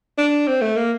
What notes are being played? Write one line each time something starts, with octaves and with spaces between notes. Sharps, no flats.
D4
C4
A3
A#3